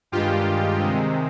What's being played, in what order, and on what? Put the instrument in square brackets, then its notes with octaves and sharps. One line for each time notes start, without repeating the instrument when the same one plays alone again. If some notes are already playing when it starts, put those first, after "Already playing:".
[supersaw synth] G2 D#3 G#3 F4 G4
C3 D#3 G#3 C4